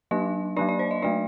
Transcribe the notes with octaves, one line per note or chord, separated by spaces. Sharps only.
F#3 A#3 D4 D#5
F#3 A#3 D4 D5
D5
C5
D#5
F#3 A3 D4 D5